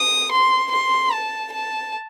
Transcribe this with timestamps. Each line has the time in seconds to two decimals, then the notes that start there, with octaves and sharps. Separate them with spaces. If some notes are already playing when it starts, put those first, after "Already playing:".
Already playing: D#6
0.31 C6
0.71 C6
1.12 A5
1.52 A5